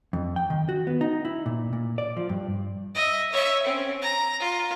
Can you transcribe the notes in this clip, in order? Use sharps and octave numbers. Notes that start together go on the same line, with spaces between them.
F2
G5
D#3
F#4
B3
D#4
E4
A#2
A#2
D5
F3
G2
D#5 E5
C#5 E5
C4 C#4
A#5
F4